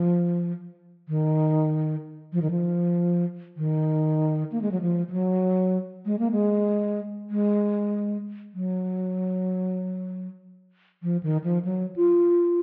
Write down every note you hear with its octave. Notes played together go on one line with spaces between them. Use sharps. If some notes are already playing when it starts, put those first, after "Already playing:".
Already playing: F3
D#3
F3
D#3
F3
D#3
A#3
G#3
F#3
F3
F3
F#3
G#3
A#3
G#3
G#3
F#3
F3
D#3
F3
F#3
F4